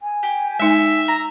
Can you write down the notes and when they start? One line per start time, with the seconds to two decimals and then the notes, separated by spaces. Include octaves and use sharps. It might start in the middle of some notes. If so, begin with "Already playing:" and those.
0.01 G#5
0.23 G4
0.60 G#3 D#4 E5
1.08 A#5